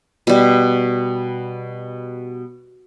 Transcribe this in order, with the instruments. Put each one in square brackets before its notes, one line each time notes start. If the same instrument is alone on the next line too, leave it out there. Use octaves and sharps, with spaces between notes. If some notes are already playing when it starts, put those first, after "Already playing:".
[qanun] B2 G3